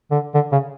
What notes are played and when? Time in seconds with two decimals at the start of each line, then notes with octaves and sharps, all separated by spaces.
0.11 D3
0.34 D3
0.52 C#3